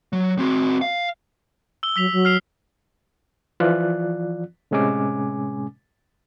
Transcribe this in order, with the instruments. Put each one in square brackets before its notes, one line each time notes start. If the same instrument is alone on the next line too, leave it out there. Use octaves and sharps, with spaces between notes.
[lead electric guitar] F#3
C4 F#4
F5
[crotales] E6 G7
[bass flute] F#3 [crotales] E6 B6 F7
[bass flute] F#3
[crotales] F6 C7 F7
[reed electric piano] E3 F3 F4 D5 F#6
A2 C3 G#3 C#4 G#5 D6